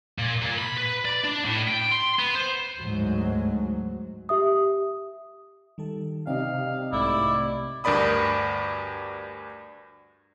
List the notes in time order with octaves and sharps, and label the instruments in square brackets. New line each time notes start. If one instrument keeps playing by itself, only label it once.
[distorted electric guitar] A#2
A#2
B5
B4
D5
D4
A2
G5
C6
B3
C5
[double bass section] D2 G#2 F#3
[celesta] G4 E5 D#6
[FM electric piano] D#3 G3 A4
[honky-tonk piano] C3 D#4 [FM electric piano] D5 [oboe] F5
[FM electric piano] B1 G#2 A3 [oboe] E4 [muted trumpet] D5
[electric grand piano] D2 G2 A#4 D5 B5 D#6